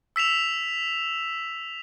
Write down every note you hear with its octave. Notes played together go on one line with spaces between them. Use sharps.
E6 B6 E7 F7